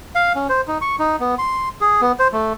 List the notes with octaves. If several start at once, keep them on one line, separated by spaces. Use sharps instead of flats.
F5
C#4
C5
D#4
C#6
D#4
B3
C6
G#4
B3
C5
A3